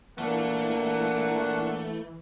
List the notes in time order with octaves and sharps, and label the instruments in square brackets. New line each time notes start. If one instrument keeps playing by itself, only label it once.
[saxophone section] A#2 D4 F#5 [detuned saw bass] E3 [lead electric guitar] A3 [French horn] A#3